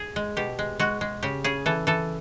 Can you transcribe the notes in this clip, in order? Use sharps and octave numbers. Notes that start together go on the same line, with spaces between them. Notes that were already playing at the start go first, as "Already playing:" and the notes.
Already playing: G#4
G#3
B2 G4
G#3
G#3 F#4
G#3
C#3 G4
C#3 G#4
E3 A4
E3 A4